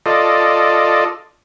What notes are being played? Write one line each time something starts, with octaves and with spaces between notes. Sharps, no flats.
F4 A4 D5 D#5